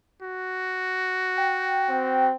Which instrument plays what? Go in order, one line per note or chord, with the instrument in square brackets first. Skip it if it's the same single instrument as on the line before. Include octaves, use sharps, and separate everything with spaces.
[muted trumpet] F#4
[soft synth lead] G5
[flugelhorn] C4